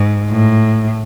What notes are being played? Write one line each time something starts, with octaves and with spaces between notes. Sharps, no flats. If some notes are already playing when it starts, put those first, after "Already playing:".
Already playing: G#2
A2